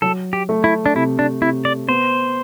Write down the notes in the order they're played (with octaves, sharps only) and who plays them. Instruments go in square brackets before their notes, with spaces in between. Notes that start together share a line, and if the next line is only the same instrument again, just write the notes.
[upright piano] F#3 [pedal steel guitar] A4
[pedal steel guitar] G4
[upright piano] A3
[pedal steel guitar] E4
D4
[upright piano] C3 [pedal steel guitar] E4
[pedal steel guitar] D4
[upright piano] C3 [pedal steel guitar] E4
[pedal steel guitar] D5
[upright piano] B3 [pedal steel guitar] C5